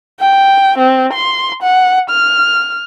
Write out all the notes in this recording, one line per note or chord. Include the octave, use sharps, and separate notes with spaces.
G5
C4
C6
F#5
F6